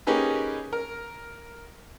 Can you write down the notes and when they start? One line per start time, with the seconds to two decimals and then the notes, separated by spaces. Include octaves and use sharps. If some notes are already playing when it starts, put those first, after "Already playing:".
0.07 A#3 C#4 D#4 G4 G#4 B4
0.73 A#4